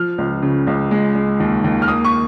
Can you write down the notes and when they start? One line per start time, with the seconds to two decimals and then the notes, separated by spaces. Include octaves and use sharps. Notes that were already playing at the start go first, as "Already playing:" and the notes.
Already playing: F3 F6
0.18 C#2
0.42 C#3
0.67 C#2
0.91 G#3
1.15 G#3
1.40 D#2
1.64 D#2
1.82 F6
1.88 A#3 D#6
2.05 C#6